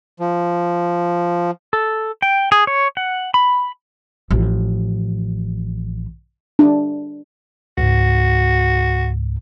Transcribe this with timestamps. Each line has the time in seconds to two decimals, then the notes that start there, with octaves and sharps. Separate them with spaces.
0.20 F3
1.73 A4
2.22 G5
2.52 G#4
2.67 C#5
2.97 F#5
3.34 B5
4.31 A1 F3
6.59 D4
7.78 C#2 G#2 F#4